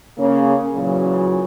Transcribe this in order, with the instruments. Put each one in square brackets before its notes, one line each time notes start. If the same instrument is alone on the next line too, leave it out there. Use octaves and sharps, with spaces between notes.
[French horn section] C#3 A#3 C#4
A#2 C#3 E3 F#3